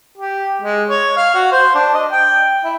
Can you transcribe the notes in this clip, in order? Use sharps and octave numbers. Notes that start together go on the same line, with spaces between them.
G4
G#3
C#5
F5
F#4
C5
D4
D#5
G5
E4